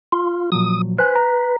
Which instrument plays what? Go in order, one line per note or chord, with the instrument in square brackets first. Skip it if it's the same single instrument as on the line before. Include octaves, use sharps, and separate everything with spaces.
[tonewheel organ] F4
[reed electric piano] A#2 F3 F#3 [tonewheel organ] D#6
[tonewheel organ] B4 [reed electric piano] C5 G#5
[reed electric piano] A#5